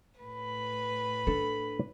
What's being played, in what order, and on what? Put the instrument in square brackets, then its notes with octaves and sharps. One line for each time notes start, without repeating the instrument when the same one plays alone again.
[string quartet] A2 B4 [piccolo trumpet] B5
[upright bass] D4 [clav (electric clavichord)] A4